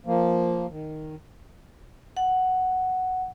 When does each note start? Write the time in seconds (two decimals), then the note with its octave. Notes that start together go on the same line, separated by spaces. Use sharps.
0.06 F3 A#3
0.71 D#3
2.17 F#5